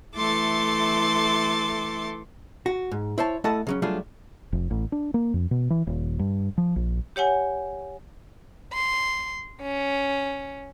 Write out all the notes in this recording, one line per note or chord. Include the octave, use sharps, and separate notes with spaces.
E3 A3 A4 C6 D6 A6
F#4
G#2
E4 C5 C#5 A5
A3 E4 A4 D#5 F#5 A5
C#3 F#3 C#4
F#3 G3 A3 D4 F4 G#4
F1
A1
D4
A#3
F2
B2
E3
D#1
G2
F3
A#1
G4 C#5 F#5 G#5
C6
C#4